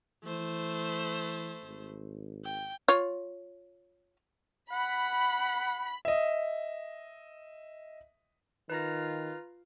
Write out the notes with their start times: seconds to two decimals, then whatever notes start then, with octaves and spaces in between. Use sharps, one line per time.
0.24 E3 A3 C5
1.63 G#1
2.44 G5
2.88 F4 C#5
4.72 F#5 B5
6.05 D#5 E5
8.70 D#3 F4 B4 A#5 A#6